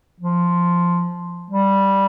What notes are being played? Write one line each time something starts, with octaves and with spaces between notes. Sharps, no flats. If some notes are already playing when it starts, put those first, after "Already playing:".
F3
G3